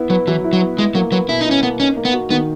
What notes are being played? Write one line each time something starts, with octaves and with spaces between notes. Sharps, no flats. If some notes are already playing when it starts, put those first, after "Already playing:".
Already playing: B3 E4
F#3 B4
E3 F#3
E4
F#3
B3
G#3 E4
F#3 A#3
F#3 B4
B2 E4
D#4 E4
C#4
A#3 B3
C#4 D#4
A#3
B3
F#4
D#3 B3